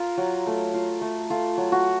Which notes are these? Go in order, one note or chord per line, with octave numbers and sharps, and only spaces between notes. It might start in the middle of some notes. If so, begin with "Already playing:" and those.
Already playing: F4 A#4
F#3
A3
F4
A3
A3 F4
F#3
F#4